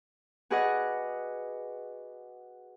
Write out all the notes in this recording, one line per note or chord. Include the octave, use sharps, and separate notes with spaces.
F#4 G#4 B4 D5 D#5 F#5